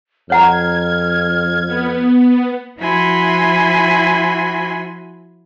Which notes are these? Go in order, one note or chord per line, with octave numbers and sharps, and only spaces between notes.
F2 C#5 F#5 A#5 F6 G#6
B3
F3 E4 F#4 G#5 B5 C6